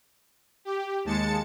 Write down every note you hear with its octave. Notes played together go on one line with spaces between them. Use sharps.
G4
D#2 G#3 A5 A6 C#7